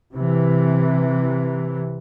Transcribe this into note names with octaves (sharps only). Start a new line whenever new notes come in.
C3 E3